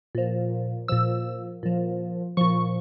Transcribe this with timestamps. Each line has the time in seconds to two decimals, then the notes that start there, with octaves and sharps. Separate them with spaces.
0.15 A#2 F3
0.88 A#2 F3 E6
1.63 A#2 F3
2.37 A#2 F3 C#6